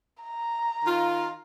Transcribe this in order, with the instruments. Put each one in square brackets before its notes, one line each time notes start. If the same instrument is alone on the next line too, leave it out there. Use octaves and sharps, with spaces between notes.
[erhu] A#5
[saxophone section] D#3 F4